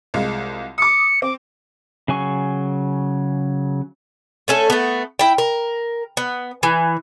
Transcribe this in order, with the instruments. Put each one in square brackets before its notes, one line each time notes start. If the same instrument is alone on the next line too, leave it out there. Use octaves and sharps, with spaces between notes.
[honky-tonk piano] C2 G#3 F4
[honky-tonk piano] D6 D#6 [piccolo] C#7
[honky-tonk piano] C4 [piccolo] D6
[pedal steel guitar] C#3 F#3 G#5 C#6
[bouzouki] A3 C#4 A4
A3 B3
E4 G5
A#4
B3
E3